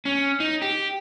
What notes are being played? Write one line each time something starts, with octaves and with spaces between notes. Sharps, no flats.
C#4
D#4
G4